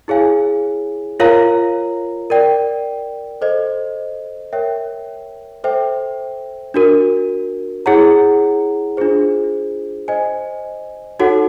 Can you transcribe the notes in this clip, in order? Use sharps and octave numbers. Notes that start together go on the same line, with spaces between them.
E4 G#4 C#5 F5 G#5
F4 A#4 C#5 F5 A#5
A#4 D5 G5
A4 C5 D#5
A#4 C#5 E5 G5
A4 C5 E5 G5
D4 F#4 A#4
E4 G#4 C#5 F#5 A#5
D4 F4 G#4 C5
C5 D#5 G#5
D#4 F#4 A4 C#5 F#5